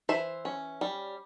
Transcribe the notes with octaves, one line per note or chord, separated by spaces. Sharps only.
E3 C5 E5
C#4
G3